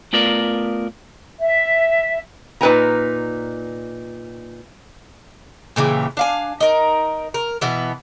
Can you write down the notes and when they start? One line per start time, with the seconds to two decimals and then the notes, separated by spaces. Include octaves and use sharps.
0.13 A3 B3 F4 A#4 D5
1.39 E5
2.61 A#2 D#4 B4 G5 G#5 A#5
5.76 A#2 C#3 E3 G4
6.17 D4 F5 G#5
6.60 D#4 A#4
7.34 A#4
7.61 B2 E3 B3